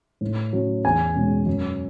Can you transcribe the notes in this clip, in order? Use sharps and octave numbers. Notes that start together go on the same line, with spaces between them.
A2
F#3 C#4
E2 G#5
B2 G#3 C#4
F#2